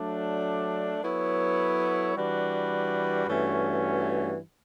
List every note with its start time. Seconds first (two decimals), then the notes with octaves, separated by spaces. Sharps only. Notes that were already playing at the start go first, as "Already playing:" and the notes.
Already playing: F#3 A3 D4
1.02 F#3 B3 E4 A4 C#5
2.15 E3 G3 D4 F#4 B4
3.27 G2 E3 A3 C#4 F#4